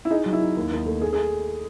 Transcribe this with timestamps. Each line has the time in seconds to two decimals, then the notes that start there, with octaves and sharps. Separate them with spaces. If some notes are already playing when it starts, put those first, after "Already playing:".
0.05 E4
0.10 D#4 G#4
0.26 F#3
0.33 E4
0.41 D#4
0.57 D#2
0.72 D#2
0.86 A3
1.01 A3 G#4
1.13 G#4